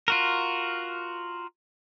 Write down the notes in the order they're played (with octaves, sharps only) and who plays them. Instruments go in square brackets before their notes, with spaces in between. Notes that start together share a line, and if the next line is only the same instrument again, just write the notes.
[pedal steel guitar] F4 F#4 A#4